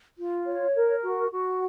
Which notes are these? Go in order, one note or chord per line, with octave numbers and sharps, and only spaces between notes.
F4
C#5
A#4
F#4
F#4